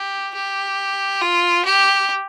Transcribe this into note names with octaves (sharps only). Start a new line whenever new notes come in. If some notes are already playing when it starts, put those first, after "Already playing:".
Already playing: G4
G4
F4
G4